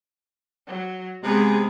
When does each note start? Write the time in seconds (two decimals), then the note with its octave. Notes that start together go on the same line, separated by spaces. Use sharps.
0.67 F#3
1.23 C3 G#3 B3 C4 G#4